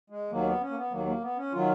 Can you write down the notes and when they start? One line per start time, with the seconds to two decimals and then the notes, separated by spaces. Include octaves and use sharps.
0.10 G#3
0.31 D#2 D#3 F#3 A#3
0.46 B3
0.61 C#4
0.70 A#3
0.76 B3
0.92 D#2 D#3 F#3 A#3
1.07 A#3
1.21 B3
1.37 C#4
1.52 D#3 F#3 F4